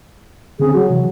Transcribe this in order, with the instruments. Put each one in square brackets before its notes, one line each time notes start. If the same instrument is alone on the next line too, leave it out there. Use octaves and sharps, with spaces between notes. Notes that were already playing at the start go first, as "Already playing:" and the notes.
[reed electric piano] D3 C4 C#4 [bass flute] G#4
[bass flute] F#3 [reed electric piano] F#4
[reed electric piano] C3 E3